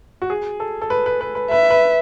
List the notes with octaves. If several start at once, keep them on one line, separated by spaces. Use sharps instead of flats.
F#4
G#4
A4
A4
B4
B4
B4
B4
B4 E5
B4